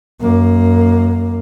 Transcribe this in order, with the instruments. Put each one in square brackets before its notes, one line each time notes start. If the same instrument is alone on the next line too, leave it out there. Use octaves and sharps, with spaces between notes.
[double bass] F#2 A#3